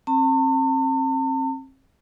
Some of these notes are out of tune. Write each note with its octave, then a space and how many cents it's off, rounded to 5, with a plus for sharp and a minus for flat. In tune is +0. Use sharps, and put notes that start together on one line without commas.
C4 +35 A5 +45